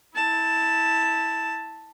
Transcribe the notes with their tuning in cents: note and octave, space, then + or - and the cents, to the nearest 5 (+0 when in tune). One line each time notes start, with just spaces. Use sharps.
E4 -15 A5 +5